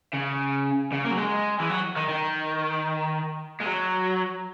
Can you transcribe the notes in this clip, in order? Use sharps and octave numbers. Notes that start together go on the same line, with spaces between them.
C#3
C#3
A#3
F#3
G#3
E3
F#3
D#3
D#3
G#3
F#3